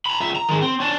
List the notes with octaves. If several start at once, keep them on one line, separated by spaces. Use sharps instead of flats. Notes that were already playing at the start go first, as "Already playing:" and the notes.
A#5 B5
C#2 E5
A#5
D#3 G#3
C4
C#4 D4